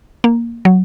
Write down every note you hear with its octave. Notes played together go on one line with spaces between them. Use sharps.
A#3
F#3